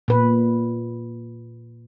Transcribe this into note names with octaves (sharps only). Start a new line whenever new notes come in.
A#2 B4